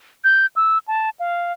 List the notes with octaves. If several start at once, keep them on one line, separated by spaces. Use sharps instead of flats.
G6
E6
A5
F5